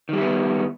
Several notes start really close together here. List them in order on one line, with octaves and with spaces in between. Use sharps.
D#3 G3 E4 B3